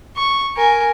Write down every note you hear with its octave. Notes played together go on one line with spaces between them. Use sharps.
C#6
A#4 G#5